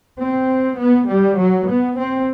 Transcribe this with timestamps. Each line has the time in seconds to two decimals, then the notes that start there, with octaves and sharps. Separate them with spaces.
0.19 C4
0.79 B3
1.09 G3
1.38 F#3
1.67 B3
1.97 C4